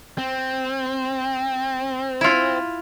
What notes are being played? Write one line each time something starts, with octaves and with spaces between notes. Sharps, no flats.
C4
E4 F4